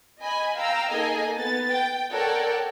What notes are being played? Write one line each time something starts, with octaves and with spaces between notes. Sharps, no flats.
D#5 G#5 B5
F5 G5 A#5 E6
A#3 D#4 G#4 A4 D#5 G#5
B3 A6
G5
A4 A#4 C#5 D5 F#5 G5